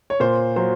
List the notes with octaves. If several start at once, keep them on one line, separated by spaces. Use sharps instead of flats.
C#5
A#2 C5
F#3 C5